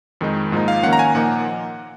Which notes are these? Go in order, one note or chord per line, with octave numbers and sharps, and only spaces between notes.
F2 D#3 G#3 D#4
G#2 F3 A#3 D#4
F5
D#3 A#3 C#4 F#5
A#5
G#5
A#2 F3 A#3 D#4 F#5